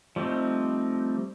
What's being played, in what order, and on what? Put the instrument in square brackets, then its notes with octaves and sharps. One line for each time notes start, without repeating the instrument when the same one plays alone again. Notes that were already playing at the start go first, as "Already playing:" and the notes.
[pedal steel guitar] F3 G3 A3 C4 D#4